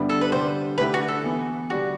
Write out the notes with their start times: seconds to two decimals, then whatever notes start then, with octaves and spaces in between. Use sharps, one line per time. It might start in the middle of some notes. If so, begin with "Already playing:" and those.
Already playing: G2 D3 G3 B3 E4
0.09 A4
0.21 B4
0.32 D3 G3 D4 G4 C5
0.78 D3 A3 E4 G4 B4
0.94 F#4
1.08 A4
1.24 E3 B3 E4
1.70 D3 G3 D4 F#4 G4